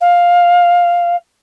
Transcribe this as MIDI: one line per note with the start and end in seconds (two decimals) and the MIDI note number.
0.01 1.16 77